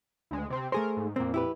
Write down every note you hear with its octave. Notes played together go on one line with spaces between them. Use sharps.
D2 G#3
C3 C4
A3 G#4 A#4 C5
G#2
F2 A#2 A#3 C4
E4 G4 B4